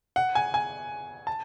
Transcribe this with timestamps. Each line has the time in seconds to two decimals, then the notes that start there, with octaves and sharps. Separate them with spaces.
0.16 F#5
0.35 G#5
0.54 G#5
1.27 A5